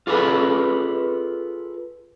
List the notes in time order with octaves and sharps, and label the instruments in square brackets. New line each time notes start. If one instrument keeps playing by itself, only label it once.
[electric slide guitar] F4 G#4 A4 B4